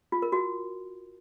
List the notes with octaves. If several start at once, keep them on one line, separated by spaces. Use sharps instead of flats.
F4
A#4
F#4